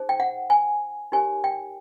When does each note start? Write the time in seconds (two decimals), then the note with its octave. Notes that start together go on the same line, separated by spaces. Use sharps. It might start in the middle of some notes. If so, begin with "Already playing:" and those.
Already playing: D#4 G#4 C5
0.09 G5
0.20 F#5
0.50 G#5
1.12 D#4 G4 A#4 C#5 G#5
1.44 G5